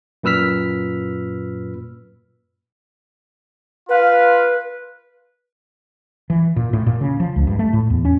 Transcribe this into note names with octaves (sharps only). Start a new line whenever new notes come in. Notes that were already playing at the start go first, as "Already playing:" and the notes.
F#2 A#2 B4 E6 F6 B6
F4 B4 F5
E3
A#2
A2
A#2
C#3
F3
C#2
G2
A3
A2
E2
C#4